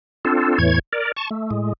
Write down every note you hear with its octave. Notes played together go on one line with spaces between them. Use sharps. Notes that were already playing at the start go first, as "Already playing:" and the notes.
C4 D4 F4 A4
E2 A2 E3 C#5 G#6
A#4 D5
A5 C#6
A3
A2 G#3